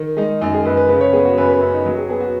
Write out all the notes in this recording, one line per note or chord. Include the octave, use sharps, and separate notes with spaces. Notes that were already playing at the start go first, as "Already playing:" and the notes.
Already playing: D#3
G#3 D#4
F#2 D#4
G#4
F#2 B4
B4
C#3 B4
C#5
B3 G#4
F#4
F#2 B4
B4
F#2 C#4
D#4
F#3
G#4
B3 G#4
F#4